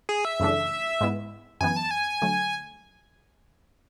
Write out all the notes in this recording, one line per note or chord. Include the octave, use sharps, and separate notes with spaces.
G#4
E5
F#2 C#3 E3 A3 D4
G#2 G#3 B3 E4
F#2 E3 B3 G#5
A5
G#5
D3 F#3 A3